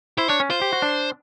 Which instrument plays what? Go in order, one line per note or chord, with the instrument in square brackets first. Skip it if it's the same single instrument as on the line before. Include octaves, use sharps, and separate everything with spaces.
[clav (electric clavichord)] E4 [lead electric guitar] C5
[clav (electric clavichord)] D4 [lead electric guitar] C#5
[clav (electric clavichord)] C#4
[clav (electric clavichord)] F4 [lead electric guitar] C5
[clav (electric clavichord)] G4
F#4
D4